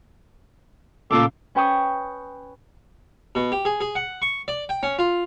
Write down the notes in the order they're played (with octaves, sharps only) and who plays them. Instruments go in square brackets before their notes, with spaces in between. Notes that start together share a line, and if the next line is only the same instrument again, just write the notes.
[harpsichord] C#2 A#2 A#3 [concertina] A4 D6
[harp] C#4 B4 G5 C#6 D#6
[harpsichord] B2
G4
G#4
G#4
F#5
C#6
D5
G5
C#4
F4